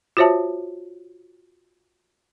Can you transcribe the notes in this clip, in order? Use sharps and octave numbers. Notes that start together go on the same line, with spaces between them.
F4 F#4 C5 C#5 E5 A5